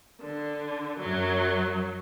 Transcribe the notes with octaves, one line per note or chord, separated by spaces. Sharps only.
D3
F#2 F#3